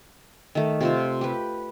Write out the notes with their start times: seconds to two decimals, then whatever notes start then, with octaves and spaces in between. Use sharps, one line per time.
0.55 D#3 A3
0.80 C3 F4 C5
1.21 G4 B4